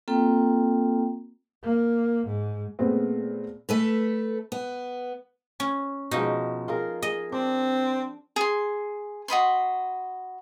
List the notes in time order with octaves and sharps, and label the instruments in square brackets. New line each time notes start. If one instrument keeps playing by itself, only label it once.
[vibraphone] A#3 C4 F4 A4 G5 A#5
[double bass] A#3
G#2
[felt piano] A#2 G#3 A3 B3 C4
[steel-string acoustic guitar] A3 A4 B4
B3
[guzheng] C#4
[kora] B2 F3 G#3 [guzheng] D#4
[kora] F4 G#4 A#4
[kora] G#4 [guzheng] D#5
[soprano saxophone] C4 [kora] D4
[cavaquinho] G#4 C6
F#4 D#5 B5 C6